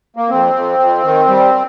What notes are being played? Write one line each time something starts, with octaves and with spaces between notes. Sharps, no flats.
A#3
F2 C4
F2
F2
D#3
G3